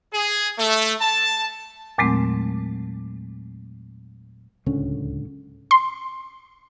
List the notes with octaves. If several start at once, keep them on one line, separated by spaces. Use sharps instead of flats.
G#4
A3
A5
E2 A#2 F#3 G#3 A3 C4
D1 C#2 D3 C#4
C6